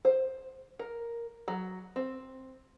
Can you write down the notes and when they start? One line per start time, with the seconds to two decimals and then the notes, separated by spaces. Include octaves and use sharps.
0.05 C5
0.79 A#4
1.48 F#3
1.96 C4